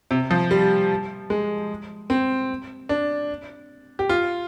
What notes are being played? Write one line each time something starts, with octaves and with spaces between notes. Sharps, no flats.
C3
F3
G3
G#3
C4
D4
G4
F4